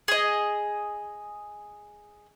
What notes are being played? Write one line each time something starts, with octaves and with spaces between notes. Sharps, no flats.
G#4 D#5